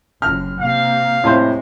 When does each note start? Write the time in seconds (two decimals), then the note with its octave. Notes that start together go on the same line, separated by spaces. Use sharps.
0.22 F#1 D3 F6
0.60 C3 A#3 F5
1.24 A2 C3 G#3 C5